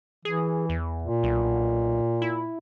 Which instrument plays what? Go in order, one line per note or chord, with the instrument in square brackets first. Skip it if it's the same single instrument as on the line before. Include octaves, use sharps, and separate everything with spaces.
[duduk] E3 [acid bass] G#4
[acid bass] E2
[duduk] A#2
[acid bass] B1
E4